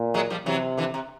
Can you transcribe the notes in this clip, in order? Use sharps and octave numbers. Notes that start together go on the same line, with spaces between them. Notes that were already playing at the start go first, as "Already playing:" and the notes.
Already playing: A#2
F#3 G#3
F3 G3
C3 E3 F#3
D3 E3
C3